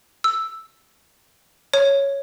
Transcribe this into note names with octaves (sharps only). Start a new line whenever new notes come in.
E6
C#5